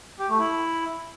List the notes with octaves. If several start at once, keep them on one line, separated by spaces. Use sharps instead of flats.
G4
A3
E4